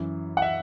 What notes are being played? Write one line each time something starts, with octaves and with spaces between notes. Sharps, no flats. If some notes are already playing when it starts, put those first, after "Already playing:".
Already playing: F#2 E3
F#5
E5